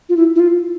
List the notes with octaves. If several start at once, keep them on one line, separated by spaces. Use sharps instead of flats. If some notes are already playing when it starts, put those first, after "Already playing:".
F4
E4
E4
F4